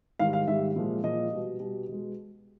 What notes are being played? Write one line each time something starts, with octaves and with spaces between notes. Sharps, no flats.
G#2 D#3 G3 F5
F5
G#2 D#3 G3 E5
A#2 F3 G#3
A#2 F3 G#3 D#5
B2 G3
B2 G3
B2 G#3